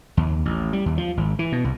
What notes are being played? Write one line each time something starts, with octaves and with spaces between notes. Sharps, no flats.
D#2
A1
G3
D#2
F3
G#1
E3
B2
C2